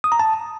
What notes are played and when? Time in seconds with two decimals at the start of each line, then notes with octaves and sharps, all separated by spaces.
0.04 D#6
0.12 A#5
0.19 A5